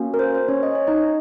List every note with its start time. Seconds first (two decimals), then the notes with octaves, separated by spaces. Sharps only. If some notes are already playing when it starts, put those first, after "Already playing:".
Already playing: A#3 C#4 F#4
0.14 A#4
0.19 C5
0.34 C5
0.48 C#4 C#5
0.63 D#5
0.75 C#5
0.87 D#4 D#5